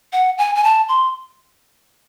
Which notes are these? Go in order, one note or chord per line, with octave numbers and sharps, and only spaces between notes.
F#5
G#5
G#5
A5
C6